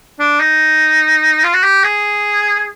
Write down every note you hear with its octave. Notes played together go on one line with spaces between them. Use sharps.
D4
D#4
F4
F#4
G4
G#4